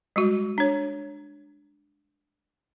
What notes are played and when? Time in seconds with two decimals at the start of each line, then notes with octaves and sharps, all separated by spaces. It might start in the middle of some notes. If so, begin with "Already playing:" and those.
0.16 G3 G#3 F#4
0.58 D4 C#5